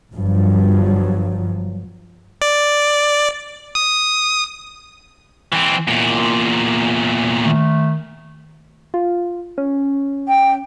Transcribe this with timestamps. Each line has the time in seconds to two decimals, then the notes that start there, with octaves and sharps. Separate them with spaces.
0.13 G1 G2 F3 F#3
2.42 D5
3.75 D#6
5.53 E3 C4
5.88 E2 A#2
7.43 D#3 A3
8.94 F4
9.58 C#4
10.27 G5